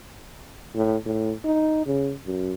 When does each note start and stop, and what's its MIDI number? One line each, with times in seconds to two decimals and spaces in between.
0.75 0.96 45
1.05 1.32 45
1.44 1.83 63
1.86 2.12 49
2.26 2.54 42